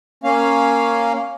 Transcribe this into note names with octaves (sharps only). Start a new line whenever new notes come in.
A#3 C#4 F5